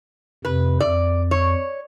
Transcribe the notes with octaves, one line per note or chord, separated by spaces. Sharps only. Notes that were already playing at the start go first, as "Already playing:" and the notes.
F2 C3 B4
F2 D5
C#5